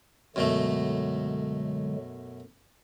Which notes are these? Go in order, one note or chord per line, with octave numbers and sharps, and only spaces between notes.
F#2 B2 D3 F#3 G#3 A3